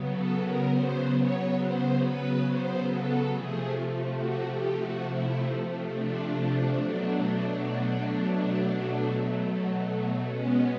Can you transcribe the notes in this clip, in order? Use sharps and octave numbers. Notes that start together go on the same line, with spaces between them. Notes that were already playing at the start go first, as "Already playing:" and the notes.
Already playing: C#3 F#3 B3
A4
A#4
C5
C#5
C5
B4
C5
A4
C3 F3 A3 G#4
F#4
G4
F#4
E4
D4
B2 F#3 A3
B2 G#3 B3 C#4